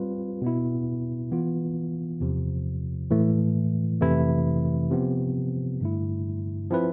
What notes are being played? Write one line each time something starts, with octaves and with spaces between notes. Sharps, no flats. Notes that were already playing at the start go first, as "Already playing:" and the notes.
Already playing: G3 C4 F4 B4
B2 B3 E4
E3 B3 F4
E2 C3 F3
A2 E3 A3
F2 C3 E3 A3 E4
C3 F3 B3
G2 D3 A3 E4
F3 C4 E4 B4